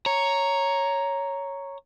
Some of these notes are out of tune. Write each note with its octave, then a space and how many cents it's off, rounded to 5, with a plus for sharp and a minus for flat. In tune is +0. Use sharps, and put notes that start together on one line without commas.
C#5 +0 A#5 +0